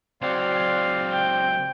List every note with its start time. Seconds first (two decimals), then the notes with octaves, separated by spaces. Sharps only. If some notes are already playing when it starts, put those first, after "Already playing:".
0.22 C#2 F#3 C4 D5 F5 C6
1.13 G5